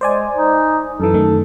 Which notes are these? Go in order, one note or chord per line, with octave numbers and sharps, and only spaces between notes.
G#3 C5 D5 G#5
D#4
F#2 E3 A4
F#2 D#3 A3